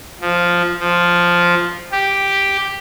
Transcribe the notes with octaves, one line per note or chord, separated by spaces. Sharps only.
F3
F3
G4